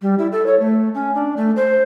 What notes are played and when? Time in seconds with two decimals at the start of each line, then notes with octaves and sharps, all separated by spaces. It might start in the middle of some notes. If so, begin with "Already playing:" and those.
0.02 G3
0.19 E4
0.32 A4
0.46 C#5
0.60 A3
0.94 C#4
1.15 D4
1.37 A3
1.56 C5